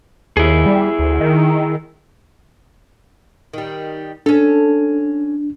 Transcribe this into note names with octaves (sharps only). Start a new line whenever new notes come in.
D#2 E4 G#4
G3
D2
D#3
D#3 G3
C#4 D4 A4